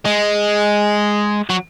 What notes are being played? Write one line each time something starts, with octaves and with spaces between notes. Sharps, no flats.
G#3
F#3